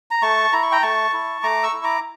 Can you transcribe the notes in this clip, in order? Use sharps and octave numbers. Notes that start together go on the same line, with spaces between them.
A#5
A3 A5 C#6
E4 A#5
C#6
G5 A#5
A3 A5 C#6
E4
A3 A#5 D6
C#6 E6
E4
A#5 D6